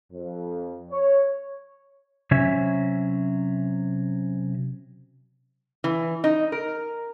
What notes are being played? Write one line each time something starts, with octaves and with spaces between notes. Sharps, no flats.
F2
C#5
C3 F#3 C#4 E5 G#5
E3
D#4
A#4